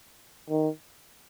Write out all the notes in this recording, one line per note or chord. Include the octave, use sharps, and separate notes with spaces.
D#3